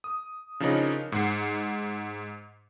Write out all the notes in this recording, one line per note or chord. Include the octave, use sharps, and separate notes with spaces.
D#6
C#3 F3 D4 D#4 A#4 C#5
G#2 F#5 C7